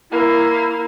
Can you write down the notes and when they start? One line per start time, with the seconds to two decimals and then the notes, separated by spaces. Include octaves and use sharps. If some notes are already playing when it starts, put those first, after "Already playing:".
0.11 A#3 E4